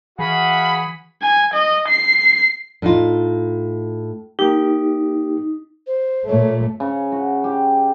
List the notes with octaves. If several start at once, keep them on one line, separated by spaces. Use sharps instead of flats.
E3 F#4 G#4 E5 F5 B5
G#5
D#5
C7
A2 D#4 F4
A#3 D#4 G4
C5
A#2 A3 C#5
C#3
F#4
G4